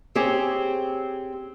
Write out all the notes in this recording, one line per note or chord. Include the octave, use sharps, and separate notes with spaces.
C4 G4 G#4 C#5